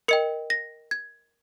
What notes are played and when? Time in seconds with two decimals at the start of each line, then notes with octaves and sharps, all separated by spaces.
0.08 A#4 D#5 G5 C#7
0.50 A#6
0.91 G#6